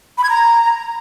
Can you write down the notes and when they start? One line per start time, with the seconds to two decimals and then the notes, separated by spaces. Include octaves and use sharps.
0.18 B5
0.24 G#6
0.29 A#5